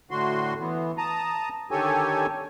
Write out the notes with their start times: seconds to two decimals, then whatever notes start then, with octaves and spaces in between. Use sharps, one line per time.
0.11 A2 D3 F#4 C6
0.60 E3 B3
0.98 A5 A#5 D#6
1.71 D3 D#3 G4 A4 C#5 G#5